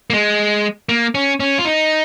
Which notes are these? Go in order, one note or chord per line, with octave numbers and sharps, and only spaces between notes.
A#3
G#3
A#3
C#4
C#4
F4
D#4